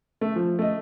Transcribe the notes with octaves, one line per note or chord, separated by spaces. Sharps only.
A3
F3
A3 D#5